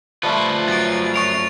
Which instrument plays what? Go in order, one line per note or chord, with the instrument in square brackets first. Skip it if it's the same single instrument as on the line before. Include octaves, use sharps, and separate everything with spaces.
[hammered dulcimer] F3 G3 A3 [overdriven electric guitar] F4 B4
[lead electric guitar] F#2 [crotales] A6 D7
[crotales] C#6 D7 F7